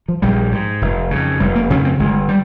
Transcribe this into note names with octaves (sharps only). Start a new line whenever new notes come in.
F3
A#1 G3
G#2
F1
F2 C#3
F1 G3
A#3
F2 C#3 C#4
C4
G1 G#3
G3